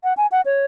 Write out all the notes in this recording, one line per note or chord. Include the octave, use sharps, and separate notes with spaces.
F#5
G#5
F#5
C#5